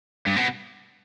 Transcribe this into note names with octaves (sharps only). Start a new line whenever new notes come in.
G2
B2